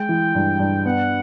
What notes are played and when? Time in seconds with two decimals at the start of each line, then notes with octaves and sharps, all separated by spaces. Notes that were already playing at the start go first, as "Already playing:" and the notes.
Already playing: G#3 G5
0.09 E3
0.35 G2
0.59 G2
0.85 B3 F#5